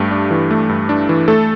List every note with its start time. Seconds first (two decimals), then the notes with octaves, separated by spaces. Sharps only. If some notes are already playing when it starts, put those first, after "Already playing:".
Already playing: G2 A3 G4
0.11 D4
0.31 E3
0.51 A3
0.69 G2
0.89 D4
1.09 E3
1.28 A3 A4